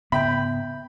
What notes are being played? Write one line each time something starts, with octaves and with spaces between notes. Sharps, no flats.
G#2 C#3 B3 E5 G5 B5 G6